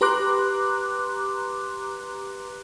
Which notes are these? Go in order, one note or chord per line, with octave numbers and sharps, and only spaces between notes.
G4 B4 A#5 C6 D6 F#6